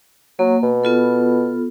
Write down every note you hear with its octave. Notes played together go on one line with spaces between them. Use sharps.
F#3 A#3
B2
B3 F4 A4